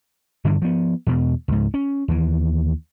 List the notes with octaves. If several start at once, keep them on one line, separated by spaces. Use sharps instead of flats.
G2 D3 E3
F3 B3
E2 B2
C#2 G#2
C#4
D#2 E3